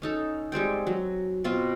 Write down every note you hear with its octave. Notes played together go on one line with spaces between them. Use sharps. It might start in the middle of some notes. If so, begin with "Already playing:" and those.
C#4 D#4 A4
G3 G#3 C4 G5
F#3
B2 C4 F4